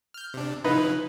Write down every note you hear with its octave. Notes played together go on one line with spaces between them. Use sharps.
F6 G6
C3 D4
C#3 F3 D#4 E4 B4